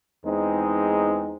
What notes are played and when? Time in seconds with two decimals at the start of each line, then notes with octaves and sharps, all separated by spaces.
0.24 E2 G#3 C4 D#4